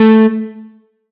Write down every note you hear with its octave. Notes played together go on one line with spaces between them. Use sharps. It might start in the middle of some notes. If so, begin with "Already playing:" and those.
Already playing: A3